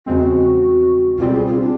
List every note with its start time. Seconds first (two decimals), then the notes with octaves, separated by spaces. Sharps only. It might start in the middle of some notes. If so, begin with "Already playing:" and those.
0.06 E2 C#3 F3 G#3 C4 F#4
1.18 C#2 B2 G3 C4 F4
1.29 A4
1.33 G#4
1.46 F4
1.62 D4